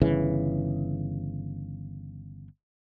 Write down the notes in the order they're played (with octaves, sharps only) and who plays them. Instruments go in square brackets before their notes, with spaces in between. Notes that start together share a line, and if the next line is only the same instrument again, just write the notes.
[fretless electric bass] G1 C#3 E3